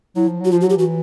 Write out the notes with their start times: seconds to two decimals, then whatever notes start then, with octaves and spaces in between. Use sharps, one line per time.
0.16 F#3 E4
0.28 F3
0.41 F#3 F#4
0.51 F3 F4
0.61 F#3 F#4
0.70 G4
0.76 E3 F#4